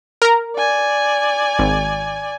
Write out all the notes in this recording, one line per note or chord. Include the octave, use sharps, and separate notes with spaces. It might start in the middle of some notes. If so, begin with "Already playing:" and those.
A#4 A#5
D5 G#5
G#1